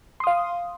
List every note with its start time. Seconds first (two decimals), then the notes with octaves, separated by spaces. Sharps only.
0.20 C6
0.24 D#6
0.27 F5